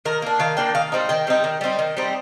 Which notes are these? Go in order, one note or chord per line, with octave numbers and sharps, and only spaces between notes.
D#3 A#4
A#3 D4
D#3 F5
A#3 D4 G5
D#3 F5
G3 C4 D#4
D#3 G5
G3 C4 D#4
D#3
G3 C4 D#4
D#3
G3 C4 D#4